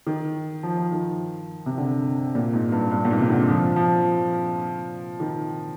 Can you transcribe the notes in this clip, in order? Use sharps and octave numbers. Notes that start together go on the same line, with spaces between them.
D#3
F3
F3
D#3
C3
D3
A#2
G#2
G2
G2
A#2
G#2
C3
D3
F3
F3
D#3